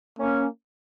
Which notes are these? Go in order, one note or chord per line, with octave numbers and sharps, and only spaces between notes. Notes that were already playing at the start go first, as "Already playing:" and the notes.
A#3 C#4